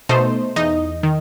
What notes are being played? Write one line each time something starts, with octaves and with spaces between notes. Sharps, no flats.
B2 A3 D#4 C5
E2 D#4 D#5
D#3